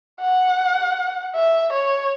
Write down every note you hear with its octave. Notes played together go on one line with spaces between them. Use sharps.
F#5
E5
C#5